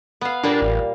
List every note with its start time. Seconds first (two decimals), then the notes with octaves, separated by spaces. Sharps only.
0.21 B3 F5
0.43 A#2 G3 A#3 D4
0.62 A1